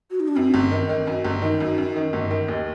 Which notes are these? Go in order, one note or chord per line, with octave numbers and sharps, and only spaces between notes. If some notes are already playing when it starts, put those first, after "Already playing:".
F#4
D#4
D4
F#2 C4
G1
D#3
D#3
F#2
G1
D#3 D#4
F#2
F#2
D#3
G1
D#3
D#2